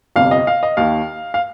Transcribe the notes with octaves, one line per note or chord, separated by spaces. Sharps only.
G1 F2 C3 F5
D#5
F5
D#5
D#2 D#3 F5
F5